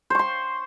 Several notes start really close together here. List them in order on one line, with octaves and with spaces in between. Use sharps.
C5 C#6 C6